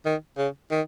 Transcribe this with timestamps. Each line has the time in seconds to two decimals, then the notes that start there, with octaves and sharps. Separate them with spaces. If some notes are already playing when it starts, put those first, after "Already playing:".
0.06 D#3
0.38 C#3
0.71 D#3